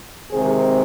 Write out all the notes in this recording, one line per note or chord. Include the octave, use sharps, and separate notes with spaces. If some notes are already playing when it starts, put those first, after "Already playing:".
C3 D#3 G#3 C4 G#4 C5